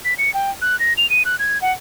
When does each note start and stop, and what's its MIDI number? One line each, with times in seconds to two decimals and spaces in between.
0.05 0.14 95
0.18 0.33 97
0.34 0.51 79
0.62 0.78 90
0.80 0.93 94
0.97 1.09 101
1.10 1.23 99
1.25 1.36 90
1.39 1.61 92
1.62 1.72 78